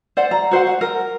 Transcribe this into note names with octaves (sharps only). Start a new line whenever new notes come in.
C5 D5 F#5
A#5
F#4 C5 F5 F#5
F#5
A#4